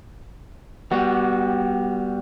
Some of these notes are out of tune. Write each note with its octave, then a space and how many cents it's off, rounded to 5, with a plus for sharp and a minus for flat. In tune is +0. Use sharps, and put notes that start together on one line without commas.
G3 +0 B3 -15 F#4 +15